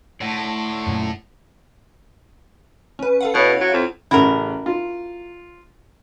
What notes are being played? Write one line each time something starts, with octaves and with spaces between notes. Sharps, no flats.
A2 D5 F#5
F#2 A#2
C#4 B4
A4 F5 F#5
B2 E4 C#5
F#3
F2
A1 C#3 E4 F#4 A#4
F4